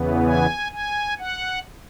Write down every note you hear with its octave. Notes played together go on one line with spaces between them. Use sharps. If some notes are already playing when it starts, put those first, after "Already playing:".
Already playing: E2 C#3 E3 B3
G#5
G#5
F#5